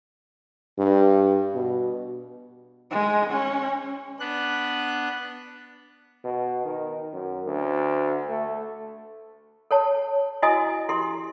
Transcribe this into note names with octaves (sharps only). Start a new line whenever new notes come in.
G2
B2
G#3
C#4
B3 D4 F#6
B2
D#3
F#2
D2
A3
A4 C#5 A5
E4 F#4 D#5 G#5 D#6
E4 G4 A4 C6